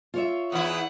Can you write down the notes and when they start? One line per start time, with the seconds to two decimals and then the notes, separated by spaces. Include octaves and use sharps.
0.14 F4 C#5 E5
0.52 E2 E4 F#5 D#6